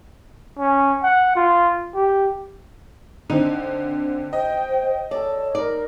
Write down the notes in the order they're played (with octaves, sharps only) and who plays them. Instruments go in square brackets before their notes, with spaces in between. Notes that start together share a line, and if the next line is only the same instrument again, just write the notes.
[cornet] C#4
F#5
F4
G4
[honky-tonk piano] D3 C4 [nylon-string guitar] D#4
[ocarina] C5 [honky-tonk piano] D#5 [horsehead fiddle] G5
[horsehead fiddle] A4 [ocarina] C#5 [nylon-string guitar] D5
[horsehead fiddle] D#4 A#4 [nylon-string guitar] D5